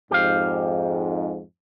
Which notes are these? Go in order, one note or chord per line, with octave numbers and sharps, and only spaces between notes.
F2 G#2 G4 F5